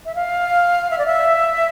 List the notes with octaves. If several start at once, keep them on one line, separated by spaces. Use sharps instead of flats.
E5
F5
E5
D5
E5